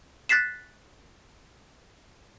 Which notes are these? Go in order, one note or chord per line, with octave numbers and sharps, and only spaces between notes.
F#6 A6 B6 C7 E7